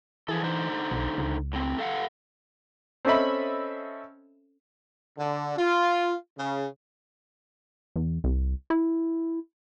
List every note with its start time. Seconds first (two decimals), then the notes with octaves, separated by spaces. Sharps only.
0.28 E3 F3 G#4 A4
0.44 D3 D#4 C5
0.91 B1
1.18 C#2
1.53 A2 C4
1.78 A4 F5 F#5
3.05 C4 C#4 A4 D#5 E5 B5
5.18 D3
5.57 F4
6.38 C#3
7.96 E2
8.24 C2
8.70 E4